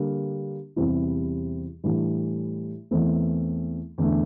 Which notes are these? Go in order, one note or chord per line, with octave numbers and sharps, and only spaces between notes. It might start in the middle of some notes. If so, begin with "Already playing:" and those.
Already playing: D3 G3 A#3
E2 C3 G3 C4 E4
A2 E3 G3 D4
E2 E3 A3 C4
E2 D3 A3